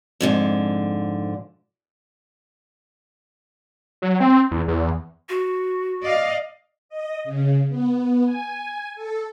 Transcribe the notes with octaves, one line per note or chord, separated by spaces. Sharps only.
F2 G#2 D3
F#3
C4
E2
E2
F#4
D5 D#5 F5
D#5
C#3
B3
G#5
A4